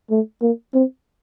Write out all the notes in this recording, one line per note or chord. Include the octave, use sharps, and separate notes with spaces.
A3
A#3
C4